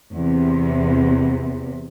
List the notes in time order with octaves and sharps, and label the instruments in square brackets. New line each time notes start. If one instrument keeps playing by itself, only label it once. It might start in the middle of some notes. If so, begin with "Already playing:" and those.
[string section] E2 C3